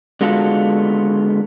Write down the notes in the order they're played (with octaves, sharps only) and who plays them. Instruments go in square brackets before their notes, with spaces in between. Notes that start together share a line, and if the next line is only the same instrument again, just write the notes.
[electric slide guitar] D3 G#3 B3 F4 F#4 A4